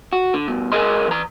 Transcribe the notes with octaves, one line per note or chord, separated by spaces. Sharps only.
F#4
D3
G2 B2
C#2 B2 G#4 A#4 D#5 C6
E3 A#5